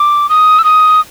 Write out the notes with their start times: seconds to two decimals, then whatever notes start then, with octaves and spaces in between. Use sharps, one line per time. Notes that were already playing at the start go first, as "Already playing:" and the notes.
Already playing: D6
0.29 D#6
0.59 E6
0.64 D#6